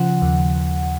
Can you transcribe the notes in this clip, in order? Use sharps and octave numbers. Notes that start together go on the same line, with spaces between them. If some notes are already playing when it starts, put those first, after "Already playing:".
Already playing: C#3 F3 F#5
D#2